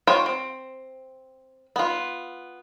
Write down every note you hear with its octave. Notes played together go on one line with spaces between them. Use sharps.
F4 C5 C#5 G5
C4
B3 F4